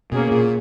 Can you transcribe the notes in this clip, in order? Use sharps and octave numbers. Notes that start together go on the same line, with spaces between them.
B2 A#3 C#4 G#4
A#2